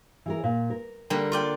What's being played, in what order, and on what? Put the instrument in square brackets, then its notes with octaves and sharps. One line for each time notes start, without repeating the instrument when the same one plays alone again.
[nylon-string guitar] E3 G#4 A#4
A#2
A#4
[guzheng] D3 G3 A#3
F4 D5 G5